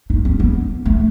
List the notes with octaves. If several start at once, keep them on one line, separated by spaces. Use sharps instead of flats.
D#4
C4
B3
A3